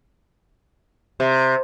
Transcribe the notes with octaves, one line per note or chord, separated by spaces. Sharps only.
C3